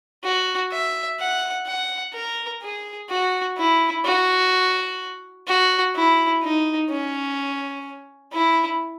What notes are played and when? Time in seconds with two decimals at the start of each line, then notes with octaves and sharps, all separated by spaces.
0.24 F#4
0.72 E5
1.19 F#5
1.67 F#5
2.14 A#4
2.62 G#4
3.10 F#4
3.58 E4
4.05 F#4
5.47 F#4
5.95 E4
6.43 D#4
6.90 C#4
8.33 E4